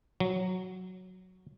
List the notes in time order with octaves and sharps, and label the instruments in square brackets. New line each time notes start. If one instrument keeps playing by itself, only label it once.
[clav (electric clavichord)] F#3